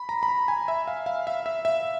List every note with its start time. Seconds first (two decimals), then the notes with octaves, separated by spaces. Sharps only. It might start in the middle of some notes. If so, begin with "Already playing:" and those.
Already playing: B5
0.09 A#5
0.23 B5
0.28 A#5
0.48 G#5
0.68 E5
0.88 F5
1.06 F5
1.27 E5
1.46 E5
1.65 E5